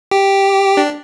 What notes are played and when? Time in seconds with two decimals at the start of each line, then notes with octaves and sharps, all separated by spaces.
0.11 G4
0.77 D4